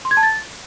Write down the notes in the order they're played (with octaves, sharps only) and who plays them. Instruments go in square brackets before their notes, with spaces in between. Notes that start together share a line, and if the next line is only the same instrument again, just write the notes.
[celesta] C6
G#6
A5
A6